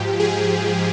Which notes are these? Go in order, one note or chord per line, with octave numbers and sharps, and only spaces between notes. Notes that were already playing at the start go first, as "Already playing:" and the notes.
Already playing: G#2 F3 G4
G#4